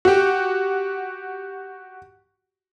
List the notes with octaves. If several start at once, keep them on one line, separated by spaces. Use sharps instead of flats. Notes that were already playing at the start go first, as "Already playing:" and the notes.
F#4 G4